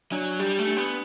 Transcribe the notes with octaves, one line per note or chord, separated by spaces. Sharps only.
F#3 D4
G3 G4
A3
D4
B3